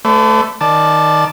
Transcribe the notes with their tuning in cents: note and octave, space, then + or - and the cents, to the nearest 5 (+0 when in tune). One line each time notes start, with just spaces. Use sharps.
A3 +0 B4 +45 D5 -30
D#3 +0 D5 +10 A5 -15